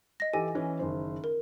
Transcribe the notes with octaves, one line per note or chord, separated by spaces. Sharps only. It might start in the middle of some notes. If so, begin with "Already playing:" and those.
D#5 A#6
E3 G4 A4 G#5
E3 C#4
F#1 D#3 C5
A#4